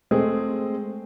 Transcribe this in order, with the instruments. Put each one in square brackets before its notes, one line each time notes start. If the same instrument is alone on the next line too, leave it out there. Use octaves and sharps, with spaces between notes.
[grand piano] G#3 A3 C4 G#4